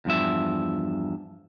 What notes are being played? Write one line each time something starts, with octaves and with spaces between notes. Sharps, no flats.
E2 G2 F3 E5